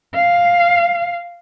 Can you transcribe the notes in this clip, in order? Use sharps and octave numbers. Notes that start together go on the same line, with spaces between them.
F5